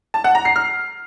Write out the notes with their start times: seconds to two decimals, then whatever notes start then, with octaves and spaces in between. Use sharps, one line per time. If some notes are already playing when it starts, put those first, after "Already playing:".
0.14 A5
0.24 F#5
0.35 A#5
0.45 C7
0.56 F6